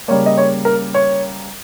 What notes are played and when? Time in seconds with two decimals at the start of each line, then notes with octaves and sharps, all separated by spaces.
0.08 C#3 G3 A#3 C#5
0.26 D#5
0.38 C#5
0.65 A#4
0.94 C#5